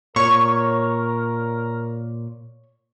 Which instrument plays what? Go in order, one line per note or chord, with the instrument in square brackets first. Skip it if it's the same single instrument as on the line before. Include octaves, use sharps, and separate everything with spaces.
[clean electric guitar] A#2 [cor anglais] A#4 [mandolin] C#5 [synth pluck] C#6